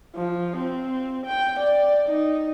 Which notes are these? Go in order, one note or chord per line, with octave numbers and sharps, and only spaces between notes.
F3
C4
G5
D5
D#4